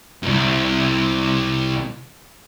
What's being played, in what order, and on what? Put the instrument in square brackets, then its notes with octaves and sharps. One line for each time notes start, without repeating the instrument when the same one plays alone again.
[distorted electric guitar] C2 F#2